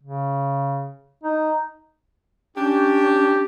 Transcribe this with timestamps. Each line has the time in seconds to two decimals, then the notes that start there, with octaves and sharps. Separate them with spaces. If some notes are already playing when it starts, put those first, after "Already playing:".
0.03 C#3
1.23 D#4
2.57 C#4 D4 G4